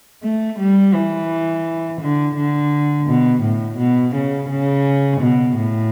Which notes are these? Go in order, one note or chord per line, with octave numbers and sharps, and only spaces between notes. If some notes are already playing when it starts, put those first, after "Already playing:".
A3
G3
E3
D3
D3
B2
A2
B2
C#3
C#3
B2
A2